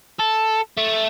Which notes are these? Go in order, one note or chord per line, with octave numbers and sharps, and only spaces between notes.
A4
A3